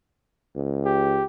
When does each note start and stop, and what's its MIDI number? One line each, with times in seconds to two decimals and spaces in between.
0.55 1.22 37
0.85 1.24 67